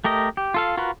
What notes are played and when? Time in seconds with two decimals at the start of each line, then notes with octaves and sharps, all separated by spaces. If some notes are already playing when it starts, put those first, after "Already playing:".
0.05 A3 G4 A#4 D#5
0.37 G4
0.54 F4 A4 F5
0.77 F4 F#4 A#4 B4